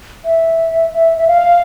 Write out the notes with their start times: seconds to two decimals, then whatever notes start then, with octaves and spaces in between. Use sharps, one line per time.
0.25 E5
0.94 E5
1.18 E5
1.28 F5